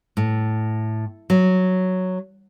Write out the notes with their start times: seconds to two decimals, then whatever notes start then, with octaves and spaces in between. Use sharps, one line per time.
0.17 A2
1.30 F#3